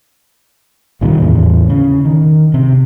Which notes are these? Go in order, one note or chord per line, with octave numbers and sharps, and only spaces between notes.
C2 A#2 D#3 G3
E2 A2
C#3
D#3
C3